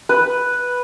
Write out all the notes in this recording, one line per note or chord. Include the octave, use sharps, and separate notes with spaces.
B4